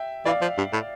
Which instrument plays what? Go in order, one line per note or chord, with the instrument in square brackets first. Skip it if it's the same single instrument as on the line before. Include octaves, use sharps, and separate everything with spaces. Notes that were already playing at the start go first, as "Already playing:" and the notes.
Already playing: [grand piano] E5 G5
[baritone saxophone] E3 [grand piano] D5 F5
[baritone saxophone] F3
G2
A2